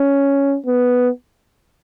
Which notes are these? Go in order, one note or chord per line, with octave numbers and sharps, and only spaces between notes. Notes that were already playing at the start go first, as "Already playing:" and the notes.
Already playing: C#4
B3